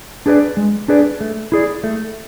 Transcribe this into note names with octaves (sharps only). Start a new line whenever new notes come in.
D4 G#4 B4 D5
G#3
D4 G#4 B4 D5
A3
E4 G#4 D5
A3